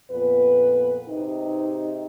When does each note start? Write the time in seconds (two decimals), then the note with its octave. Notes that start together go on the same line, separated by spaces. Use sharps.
0.11 F2 A#2 B3 B4
1.08 G#2 C3 D#4